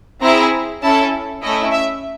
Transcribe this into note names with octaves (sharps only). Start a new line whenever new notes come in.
C4 E4 G#4 A#5
C#4 E4 A4 A5
A3 C#4 E4 D#5
E5